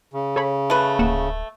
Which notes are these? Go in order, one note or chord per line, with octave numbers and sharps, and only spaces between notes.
C#3
A4 C#5 B5
A3 B4
D1 A#3 F#5 E7